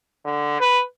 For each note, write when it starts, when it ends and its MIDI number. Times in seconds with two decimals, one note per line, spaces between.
0.25 0.56 50
0.60 0.82 71